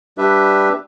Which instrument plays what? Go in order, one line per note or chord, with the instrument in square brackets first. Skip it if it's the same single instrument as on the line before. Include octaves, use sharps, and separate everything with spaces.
[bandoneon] G3 D4 G4 B4 E5